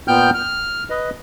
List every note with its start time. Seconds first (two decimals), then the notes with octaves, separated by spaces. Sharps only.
0.08 A#2 B3 G5 F6 G6
0.34 F6
0.90 B4 D#5